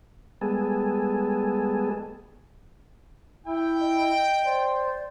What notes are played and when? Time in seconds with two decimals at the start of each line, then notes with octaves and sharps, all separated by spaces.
0.41 G3 G#3 B3 G#4 A4
3.46 E4 G5
3.81 D#5
4.45 C5 D5